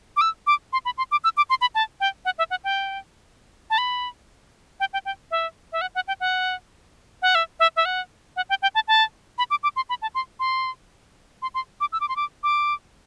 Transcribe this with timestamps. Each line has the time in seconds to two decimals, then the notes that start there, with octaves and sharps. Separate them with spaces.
0.17 D6
0.21 E6
0.47 D6
0.73 C6
0.85 B5
0.98 C6
1.12 D6
1.24 E6
1.37 D6
1.50 C6
1.61 B5
1.75 A5
2.00 G5
2.25 F#5
2.38 E5
2.50 F#5
2.64 G5
3.70 A5
3.78 B5
4.80 G5
4.93 G5
5.05 G5
5.31 E5
5.72 E5
5.81 F#5
5.95 F#5
6.08 G5
6.20 F#5
7.22 F#5
7.35 E5
7.60 E5
7.76 E5
7.85 F#5
8.36 F#5
8.49 G5
8.62 G5
8.75 A5
8.88 A5
9.38 B5
9.50 D6
9.63 D6
9.76 C6
9.89 B5
10.02 A5
10.15 C6
10.40 C6
11.42 C6
11.54 C6
11.81 D6
11.92 E6
12.01 D6
12.09 C6
12.16 D6
12.43 D6